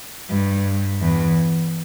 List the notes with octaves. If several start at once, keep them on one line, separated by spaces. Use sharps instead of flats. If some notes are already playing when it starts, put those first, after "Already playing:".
G2
E2